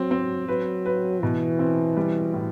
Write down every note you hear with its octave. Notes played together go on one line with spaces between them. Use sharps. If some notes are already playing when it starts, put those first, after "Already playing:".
Already playing: F#3 C4
C4
F#3 B4
B4
B2 E3
C4
G3
A2